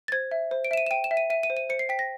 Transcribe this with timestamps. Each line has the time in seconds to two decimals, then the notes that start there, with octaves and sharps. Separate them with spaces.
0.08 A6
0.12 C5 G#6
0.31 E5
0.51 C5
0.64 D7
0.71 E5 E7
0.77 D#7
0.87 E7
0.91 G5 D#7
1.04 E7
1.11 E5
1.17 D#7
1.30 E5 D#7
1.43 D#7
1.50 C5
1.57 D#7
1.70 C5 C#7
1.79 C7
1.89 G5 B6
1.99 A#6